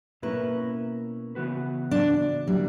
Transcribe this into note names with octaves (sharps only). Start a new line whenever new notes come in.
B2 A#3 C#4 E4 A#4 B4
C#3 E3 B3 F#4 B4
D4
D3 F#3 G3 A#3 E4